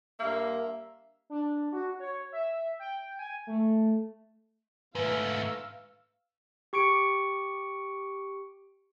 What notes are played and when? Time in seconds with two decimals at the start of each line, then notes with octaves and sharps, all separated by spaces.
0.19 G2 A#3 E5
1.30 D4
1.73 F#4
2.00 C#5
2.32 E5
2.79 G5
3.19 G#5
3.47 A3
4.95 G#2 A3 B4 F5 E6
6.73 G4 C#6 C#7 D7